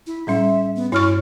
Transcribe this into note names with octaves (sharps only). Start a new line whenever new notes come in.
E4
A2 G3 C#4 E5
B3
G2 E4 C#5 C#6 F6